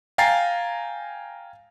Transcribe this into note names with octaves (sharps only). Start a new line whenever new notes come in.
F5 G5 G#5 A#5 A6 C7